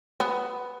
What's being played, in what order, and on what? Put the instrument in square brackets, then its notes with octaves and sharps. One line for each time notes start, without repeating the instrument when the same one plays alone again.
[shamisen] B3